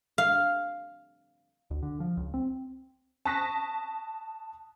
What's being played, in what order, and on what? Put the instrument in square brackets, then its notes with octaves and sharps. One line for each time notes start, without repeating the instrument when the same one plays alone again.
[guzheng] F5
[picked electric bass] D2
D3
F3
C#2
C4
[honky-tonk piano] A5 C#6 D#6 F#6 A#6 B6